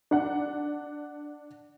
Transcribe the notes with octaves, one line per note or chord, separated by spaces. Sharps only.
D4 F#5